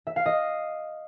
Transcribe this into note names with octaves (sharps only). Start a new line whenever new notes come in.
E5
F5
D#5